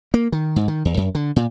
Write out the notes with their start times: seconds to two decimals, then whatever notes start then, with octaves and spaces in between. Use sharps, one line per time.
0.14 A#3
0.32 D#3
0.56 G#2
0.68 D#3
0.85 E2
0.97 F#2
1.15 D3
1.36 A#2